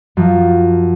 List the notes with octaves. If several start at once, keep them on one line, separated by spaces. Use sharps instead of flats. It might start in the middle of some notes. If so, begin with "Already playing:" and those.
F#2 F3